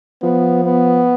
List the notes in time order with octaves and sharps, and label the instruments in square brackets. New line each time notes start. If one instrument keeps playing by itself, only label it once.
[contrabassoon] F3 [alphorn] B3
[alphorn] B3